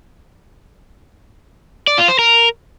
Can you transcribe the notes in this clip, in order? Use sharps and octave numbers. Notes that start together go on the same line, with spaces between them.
D5
F4
C5
A#4